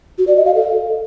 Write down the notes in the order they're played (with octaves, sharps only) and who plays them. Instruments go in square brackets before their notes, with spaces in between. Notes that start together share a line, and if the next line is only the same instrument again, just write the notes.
[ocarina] F#4
D5
D#5
F5
A4